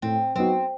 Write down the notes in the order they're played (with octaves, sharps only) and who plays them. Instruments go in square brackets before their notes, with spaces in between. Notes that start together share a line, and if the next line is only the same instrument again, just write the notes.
[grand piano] A2 [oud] C4
[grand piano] F#3 B3 D#4 F#4 [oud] C4